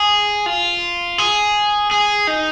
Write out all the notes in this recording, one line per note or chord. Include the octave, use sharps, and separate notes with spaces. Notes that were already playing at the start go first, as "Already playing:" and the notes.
Already playing: G#4
F4
G#4
G#4
D#4